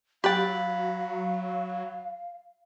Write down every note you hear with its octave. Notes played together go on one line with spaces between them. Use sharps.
F#3 G4 F5 G5 B5 F#6 A6